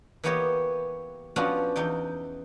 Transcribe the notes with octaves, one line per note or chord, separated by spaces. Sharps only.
E3 A#3 B3 G4 C#5 D#5
F3 B3 C#4 D4 F4 F#4
E2 D#4 G5